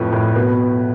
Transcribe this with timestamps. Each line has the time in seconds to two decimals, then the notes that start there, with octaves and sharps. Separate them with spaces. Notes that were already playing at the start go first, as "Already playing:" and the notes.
Already playing: F2 A2 F3 B4
0.13 A2
0.35 B2 B4